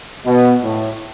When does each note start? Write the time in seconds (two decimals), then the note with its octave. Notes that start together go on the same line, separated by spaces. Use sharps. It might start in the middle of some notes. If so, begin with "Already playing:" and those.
0.26 B2
0.63 A2